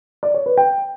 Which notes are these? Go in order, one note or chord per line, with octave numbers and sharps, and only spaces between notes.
D5
C#5
B4
G5